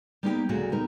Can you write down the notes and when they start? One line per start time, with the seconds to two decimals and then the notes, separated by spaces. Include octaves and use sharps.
0.23 G3 A#3 B3 D#4 E4 G4
0.49 D2 A#2 C#3 F#3 G#3 F#4
0.72 G3 B3 D#4 A#4